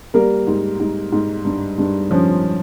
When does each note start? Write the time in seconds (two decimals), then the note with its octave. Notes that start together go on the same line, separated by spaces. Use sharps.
0.14 G3 A#3 A#4
0.47 G#2
0.80 G#2
1.12 G#2
1.45 G2
1.78 G2
2.11 F3 C#4